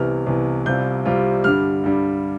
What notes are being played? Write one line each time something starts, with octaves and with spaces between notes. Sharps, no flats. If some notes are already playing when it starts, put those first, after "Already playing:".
Already playing: C2 C3 E3 B3 F6
C2 C3 E3 B3
C2 C3 G3 C4 F4 G6
C2 C3 G3 C4 F4
G2 D3 G3 F6
G2 D3 G3